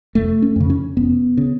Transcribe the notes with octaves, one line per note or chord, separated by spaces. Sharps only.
F1 A3
C#4
F2 C#3
C#4
F1 B3
C#3